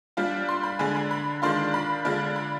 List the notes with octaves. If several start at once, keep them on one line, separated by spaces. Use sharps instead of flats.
G3 D4 F4
C6
B5
D3 G#3 D4 G#5
B5
B5
D#3 G#3 D4 F4 C6
B5
D3 G#3 D4 F4
B5